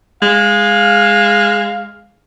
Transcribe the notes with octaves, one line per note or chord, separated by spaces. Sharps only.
G#3 F5